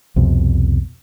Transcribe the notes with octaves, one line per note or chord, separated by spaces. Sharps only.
C2 F2 B2